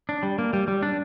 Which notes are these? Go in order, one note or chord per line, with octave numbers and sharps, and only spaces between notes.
D4
G3
A#3
G3
G3
D4